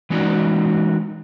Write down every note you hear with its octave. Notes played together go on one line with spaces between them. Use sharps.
E3 G#3 C#4 D#4 F#4 D5